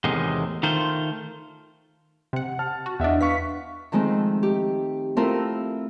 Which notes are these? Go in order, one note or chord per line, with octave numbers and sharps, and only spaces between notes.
E2 A2 C3 D#3 G#3
D#3 A3 F4 C5
C3 F#5
A5 F6
F#4
E2 D4 D#5 E5 F#5
B4 F5 C#6 B6
D#3 F3 G#3 A3 C4
G4
A3 C4 E4 F4 A#4